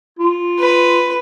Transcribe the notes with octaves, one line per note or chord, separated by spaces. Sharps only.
F4
B4